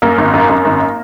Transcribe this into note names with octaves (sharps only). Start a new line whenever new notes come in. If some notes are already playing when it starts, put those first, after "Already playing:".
F#2 A#3 A#4
G#1
F#2
F#2
G#1